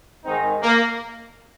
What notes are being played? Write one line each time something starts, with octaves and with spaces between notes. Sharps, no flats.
G#2 D#3 G#3 C4 D#4
A#3